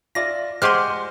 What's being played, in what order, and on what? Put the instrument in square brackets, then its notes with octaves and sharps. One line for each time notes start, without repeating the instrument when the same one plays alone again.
[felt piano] F4 D5 E5 [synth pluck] A#6
[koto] G#3 G4 G#4 [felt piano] C5 F#5 [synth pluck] C6 F6